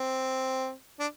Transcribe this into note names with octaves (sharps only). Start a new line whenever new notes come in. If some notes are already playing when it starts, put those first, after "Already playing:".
Already playing: C4
D4